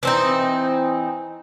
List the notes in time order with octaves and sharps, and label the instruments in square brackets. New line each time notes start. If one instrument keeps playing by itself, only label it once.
[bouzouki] E3 C4 D#4